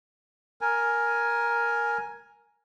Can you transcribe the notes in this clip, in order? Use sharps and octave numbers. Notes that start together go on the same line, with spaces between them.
A#4 G#5